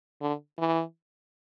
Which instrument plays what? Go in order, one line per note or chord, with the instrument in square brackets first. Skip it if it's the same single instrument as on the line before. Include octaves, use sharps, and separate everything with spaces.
[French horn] D3
E3